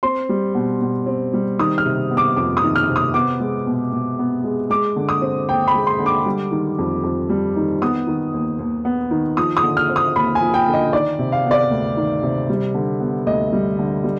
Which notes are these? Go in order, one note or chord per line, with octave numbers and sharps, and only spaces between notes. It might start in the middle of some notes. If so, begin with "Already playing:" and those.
C4 C6
G3
B2
B2
C4
G3
D#3 D#6
F6
C3
B3
D6
F2 D6
D#6
D#3
F6
C3
D#6
B3 D6
G#3
B2
B2
B3
G#3
G#3 D6
D3
D#6
C4
D#2 G5
B5
G#3
C6
D3
D6
G3
D#3
F2
F2
G3
D#3
B3 D#6
D#3
D#2
D#2
B3
D#3
F3 D#6
D#6
D3
F6
C4
D#6
D#2 B5
G#5
F3
G5
D3
D#5
D#3 D5
C3
F5
B3
D5
D2
D#3
C3
G3
D3
B3
D2 D#5
G3
D3
G3